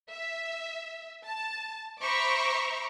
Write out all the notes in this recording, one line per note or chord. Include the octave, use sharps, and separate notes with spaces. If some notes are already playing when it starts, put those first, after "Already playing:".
E5
A5
C5 E5 A#5 B5 C#6 D6